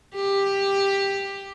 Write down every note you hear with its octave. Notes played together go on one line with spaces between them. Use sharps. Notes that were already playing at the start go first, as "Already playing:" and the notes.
G4